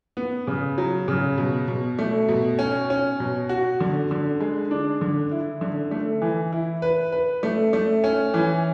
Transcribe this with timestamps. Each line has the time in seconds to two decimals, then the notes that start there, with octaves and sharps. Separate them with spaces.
0.17 B3
0.47 C#3
0.78 F#3
1.08 C#3
1.38 B2
1.68 B2
1.99 A3
2.29 B2
2.59 C#4
2.90 C#4
3.20 B2
3.49 F#4
3.80 D3
4.11 D3
4.40 G#3
4.71 D4
5.01 D3
5.31 E4
5.61 D3
5.91 A3
6.22 E3
6.53 E4
6.82 B4
7.12 B4
7.43 A3
7.73 A3
8.04 C#4
8.34 E3